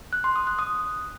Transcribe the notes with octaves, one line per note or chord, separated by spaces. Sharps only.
F#6
C6
D#6
F#6
D#6